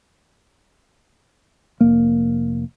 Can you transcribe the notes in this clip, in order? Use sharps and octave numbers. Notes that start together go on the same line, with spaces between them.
F1 A#3